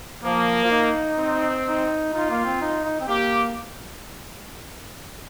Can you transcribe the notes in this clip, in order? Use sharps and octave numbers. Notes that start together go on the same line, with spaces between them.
F3 A#3
F4
D#4
C4
D#4
D#4 F4
A#3
C4
D#4
D#4
C4
A#3 G4